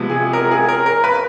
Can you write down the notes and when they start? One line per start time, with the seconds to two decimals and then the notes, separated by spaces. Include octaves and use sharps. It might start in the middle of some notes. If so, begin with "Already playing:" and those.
Already playing: C3 F3 G#3 B3
0.10 G#4
0.33 A#4
0.51 G#4
0.69 A#4
0.86 A#4
1.04 B4